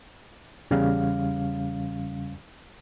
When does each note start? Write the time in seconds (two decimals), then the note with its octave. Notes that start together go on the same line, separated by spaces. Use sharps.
0.71 E2 C#3 G3 C#4 F5